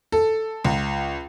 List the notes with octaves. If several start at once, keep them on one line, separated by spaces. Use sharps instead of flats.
A4
C#2